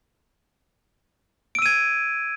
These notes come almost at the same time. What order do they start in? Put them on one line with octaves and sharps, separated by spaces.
D7 E6 D#7 G#6